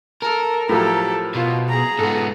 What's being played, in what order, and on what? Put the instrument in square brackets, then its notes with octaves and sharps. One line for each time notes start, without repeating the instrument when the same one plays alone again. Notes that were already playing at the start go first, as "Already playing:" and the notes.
[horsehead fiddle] A4 [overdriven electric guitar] A#4
[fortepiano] A2 F3 F#3 [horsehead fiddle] G4 A4
[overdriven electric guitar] B2 [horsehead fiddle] F4
[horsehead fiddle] G#4 A#5
[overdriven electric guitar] G#2 B3 [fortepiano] A4